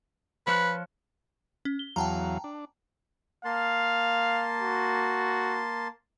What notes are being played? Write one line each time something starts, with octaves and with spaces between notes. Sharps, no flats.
F3 B4 C#5 F#6
C#4
G7
E2 F#3 F5 G5 A5 A#5
D4
A#3 F5 A5 C6
F#4